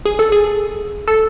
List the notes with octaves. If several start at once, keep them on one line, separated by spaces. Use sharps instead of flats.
G#4
A4
G#4
A4